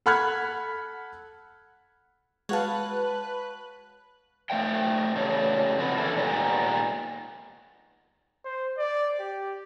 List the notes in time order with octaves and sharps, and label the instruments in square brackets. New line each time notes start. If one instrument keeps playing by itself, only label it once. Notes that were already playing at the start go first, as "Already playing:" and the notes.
[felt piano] A4 F#5 B5 F6 F#6 G#6
[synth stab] G#3 F#4 F5 [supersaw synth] B4 F#6 [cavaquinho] C#5 A5
[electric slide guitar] A3 C5 F5 G5
C#3 E3 G3 A3
F3 C4 F#4 B4
E3 A#3 D4 E4 A4
A#2 D#3 G3 G#3 B3
[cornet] C5
D5
G4